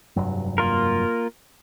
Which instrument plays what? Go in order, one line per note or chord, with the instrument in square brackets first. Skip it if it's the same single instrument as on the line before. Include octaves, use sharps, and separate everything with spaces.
[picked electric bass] F1 G2 F#3
[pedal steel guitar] A#3 F4 A#4